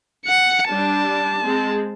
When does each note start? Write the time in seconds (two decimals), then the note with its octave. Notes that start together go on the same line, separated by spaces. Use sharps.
0.26 F#5 C#7
0.69 G3 D4 A5
1.42 G#3 C4 G#4